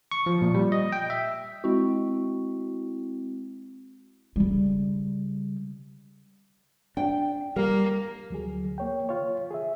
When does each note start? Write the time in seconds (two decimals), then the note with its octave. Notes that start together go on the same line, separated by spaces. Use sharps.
0.11 C#6
0.26 F3
0.42 A#2
0.54 G3
0.72 D#5
0.92 G5
1.10 E5
1.64 G#3 C4 E4 F#4
4.36 C#3 G3
6.97 D4 G5
7.56 G3 A#3 A#4
8.30 D2 F#3 G#4
8.78 A#3 C#5 G5
9.09 F4 C#5
9.50 G#4 E5